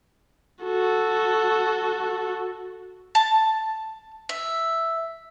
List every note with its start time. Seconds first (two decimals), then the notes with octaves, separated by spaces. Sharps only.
0.63 F#4 A4
3.15 A5
4.29 E5